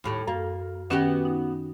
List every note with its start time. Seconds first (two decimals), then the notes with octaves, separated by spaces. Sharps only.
0.04 D#2 A2 G4
0.27 F#2 A#3
0.90 D#3 B3 C#4 F#4 G4
1.25 D#4